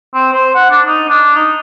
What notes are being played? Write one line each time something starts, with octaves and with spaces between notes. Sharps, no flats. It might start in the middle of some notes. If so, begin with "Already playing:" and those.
C4
C5
F#5
D4
D#4
D4
D#4